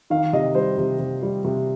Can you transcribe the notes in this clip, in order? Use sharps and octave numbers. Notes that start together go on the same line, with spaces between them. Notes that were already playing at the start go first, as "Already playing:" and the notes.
D#3 F5
C3 D#5
G3 C5
C3
C3
G3
C3